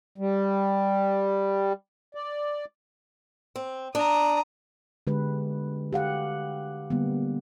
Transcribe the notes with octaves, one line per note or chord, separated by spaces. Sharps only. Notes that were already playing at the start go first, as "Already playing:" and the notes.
G3
D5
C4
D4 A#5 D#6
D3 G#3 G4 B4
G4 F5 F#5
D3 G3 A#3 B3